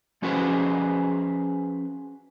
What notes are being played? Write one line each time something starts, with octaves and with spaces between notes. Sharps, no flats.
F3 C#4 F#4 G#4 B4 C5